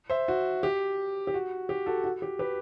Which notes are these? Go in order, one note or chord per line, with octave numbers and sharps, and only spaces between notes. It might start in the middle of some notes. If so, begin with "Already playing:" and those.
C5 E5
F#4
G4
G4
F#4
G4
F#4 A4
F#4
G4
G4 B4